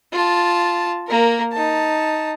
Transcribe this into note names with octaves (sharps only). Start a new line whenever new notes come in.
F4 A5
A#3 A#4
D#4 A5